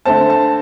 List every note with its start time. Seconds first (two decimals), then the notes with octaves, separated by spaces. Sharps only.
0.05 D3 A3 C4 A5
0.30 A5